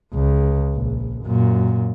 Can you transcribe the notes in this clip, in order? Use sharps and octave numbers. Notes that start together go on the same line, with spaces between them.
C#2
A#1
F#2 A#2